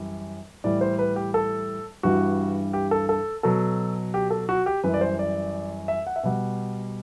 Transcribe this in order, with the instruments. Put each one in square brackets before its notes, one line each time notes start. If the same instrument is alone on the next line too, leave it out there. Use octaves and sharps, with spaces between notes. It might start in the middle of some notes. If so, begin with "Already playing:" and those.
Already playing: [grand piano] F#2 E3 G3
A2 E3 G3 D5
C5
B4
G4
A4
G2 E3 G3 F#4
G4
A4
A4
B2 F#3 A4
G4
A4
F#4
G4
F#2 E3 G3 B4
D5
C5
D5
E5
F#5
E5
B2 G3 F#5